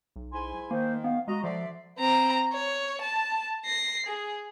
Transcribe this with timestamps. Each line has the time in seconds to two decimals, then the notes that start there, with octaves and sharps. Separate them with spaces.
0.16 B1
0.32 G#2 E4 G#5 C6
0.71 D#3 A#3 C5
1.04 B3 F5
1.28 G#3 F#4 D#5 A#5
1.44 D3 F3 D5 E5 C6
1.99 C4 A#5
2.53 C#5
3.01 A5
3.65 A#6 C7
4.06 G#4